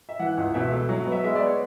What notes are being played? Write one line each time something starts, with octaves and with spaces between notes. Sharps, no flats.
E5
E3 F#5
C#2
B2 E5
A3
F#3
B3
E5
G#3 E5
D5
B3
C#5